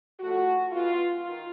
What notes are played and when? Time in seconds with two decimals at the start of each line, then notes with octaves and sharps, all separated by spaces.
0.20 A2 F3 A3 F#4
0.71 E3 G#3 B3 F4
1.23 D#3 F4